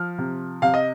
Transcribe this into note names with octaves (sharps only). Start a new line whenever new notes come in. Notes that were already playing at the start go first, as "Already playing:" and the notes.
Already playing: F3 F6
C3
C3 F5
D#5